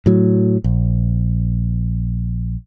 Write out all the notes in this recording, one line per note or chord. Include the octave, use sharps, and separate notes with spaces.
A2 F#3
A#1